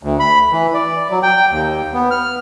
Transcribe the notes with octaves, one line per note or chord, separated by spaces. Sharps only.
D2
B5
E3
D5
F#3
G5
D#2
B3
F6